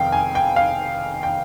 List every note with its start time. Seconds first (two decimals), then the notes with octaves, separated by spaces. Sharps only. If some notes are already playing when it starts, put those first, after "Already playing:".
Already playing: F1 F2 D#3 F5 G5
0.12 G#5
0.35 G5
0.56 F5
1.23 G5